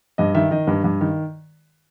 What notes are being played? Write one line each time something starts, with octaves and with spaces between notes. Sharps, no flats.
G2 D#5
D#3 E5
D#3 D#5
G2
G2
D#3